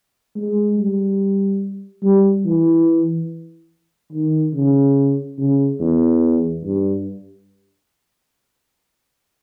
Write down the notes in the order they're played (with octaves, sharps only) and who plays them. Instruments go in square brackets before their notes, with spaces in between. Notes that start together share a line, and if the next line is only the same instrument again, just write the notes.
[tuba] G#3
G3
G3
E3
D#3
C#3
C#3
E2
G2